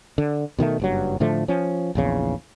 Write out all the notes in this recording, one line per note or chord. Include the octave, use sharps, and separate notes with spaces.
D3
B2 D#3 F3 A3
F#1 G2 F#3
A2 D3 F3 A3
F3 C#4
A#1 E2 C#3